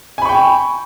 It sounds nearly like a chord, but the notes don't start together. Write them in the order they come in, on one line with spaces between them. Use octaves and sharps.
G#5 B5 C#6 G5